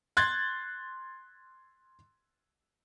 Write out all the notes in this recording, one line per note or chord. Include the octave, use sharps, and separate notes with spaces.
C6 F#6 G#6 A6